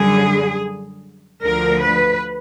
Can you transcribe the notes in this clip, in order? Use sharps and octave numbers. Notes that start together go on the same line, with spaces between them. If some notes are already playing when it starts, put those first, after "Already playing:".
Already playing: F#2 D3 G3 G#4
D2 D3 F3 A#4
B4